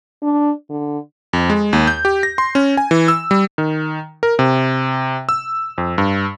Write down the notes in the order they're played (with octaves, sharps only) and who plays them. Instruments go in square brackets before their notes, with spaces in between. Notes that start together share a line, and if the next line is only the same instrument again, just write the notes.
[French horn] D4
D3
[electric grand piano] F2
G#3
D#2
G6
G4
A#6
C6
C#4
G#5
E3
E6
G3
D#3
A#4
C3
E6
F2
G2